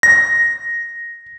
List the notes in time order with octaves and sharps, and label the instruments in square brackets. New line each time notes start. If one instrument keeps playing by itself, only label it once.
[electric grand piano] A#6